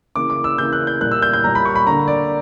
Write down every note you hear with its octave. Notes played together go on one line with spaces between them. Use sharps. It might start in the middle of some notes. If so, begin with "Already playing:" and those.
C#3 E3 A#3 D6
D6
E6
C#3 E3 A#3 G6
F#6
G6
A#2 G3 A#3 F#6
E6
G6
G6
A#2 G3 A#3 A#5
B5
C#6
B5
D3 A#3 A#5
D5